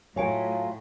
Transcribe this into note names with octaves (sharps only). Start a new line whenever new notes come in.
A2 F#3 F4 C#5 F5 G#5 D7